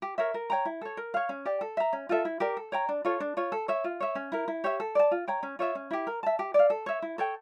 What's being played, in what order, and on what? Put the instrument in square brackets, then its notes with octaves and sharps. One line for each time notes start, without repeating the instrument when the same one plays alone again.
[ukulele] G4
A#4 C#5 E5
A#4
C#5 G5 A#5
E4
A4 C#5
A#4
C#5 F5
C#4
G4 D5 G5
A4
E5 A#5
C#4
F4 A4 E5
E4
G4 A#4 D5
A4
C#5 G5 A#5
D4
F4 A4 C#5
D4
F4 C#5
A4
C#5 E5
F4
C#5 E5
C#4
E4 A#4
E4
G4 C#5 E5
A4
D5 A5
F4
C#5 G5 A#5
C#4
F4 C#5 E5
C#4
E4 G4
A#4
E5 A5
G4
D5 F5
A4
C#5 E5
E4
A4 C#5 G5